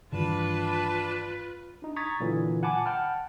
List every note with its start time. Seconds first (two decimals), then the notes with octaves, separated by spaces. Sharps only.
0.12 G2 D#3 E3 D4 F4 B4 A5
1.82 D4 D#4
1.96 A#5 C#6 D#6 G#6 A6 B6
2.20 A#2 D3 E3 F#3
2.63 F#5 G#5 A5 B5 D6
2.86 F#5 G5 A5 B5 F6